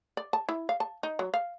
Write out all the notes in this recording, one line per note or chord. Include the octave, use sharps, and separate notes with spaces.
D5
A5
E4
F5
A5
D#4
F#3
F5